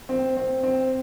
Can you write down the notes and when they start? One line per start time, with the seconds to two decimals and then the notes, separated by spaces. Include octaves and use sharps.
0.09 C4
0.37 C4
0.63 C4